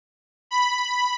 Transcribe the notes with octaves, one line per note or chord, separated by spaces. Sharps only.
B5